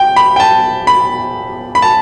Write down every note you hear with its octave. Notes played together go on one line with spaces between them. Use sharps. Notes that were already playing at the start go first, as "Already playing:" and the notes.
Already playing: G5
B5
G5
A5
B5
B5
A5